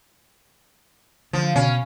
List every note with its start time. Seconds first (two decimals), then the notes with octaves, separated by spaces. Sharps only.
1.33 D3 F3
1.56 B2 C#4